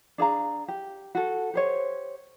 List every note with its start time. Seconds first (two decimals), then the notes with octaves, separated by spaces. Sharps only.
0.18 D4 G#4 F5 A#5
0.68 G4
1.15 F#4 A4
1.54 G4 C5 C#5